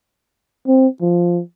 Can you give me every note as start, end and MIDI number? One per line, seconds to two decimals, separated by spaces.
0.67 0.88 60
1.01 1.41 53